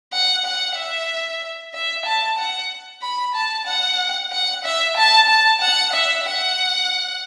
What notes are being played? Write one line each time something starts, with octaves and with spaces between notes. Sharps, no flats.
F#5
F#5
E5
E5
A5
F#5
B5
A5
F#5
F#5
E5
A5
A5
F#5
E5
F#5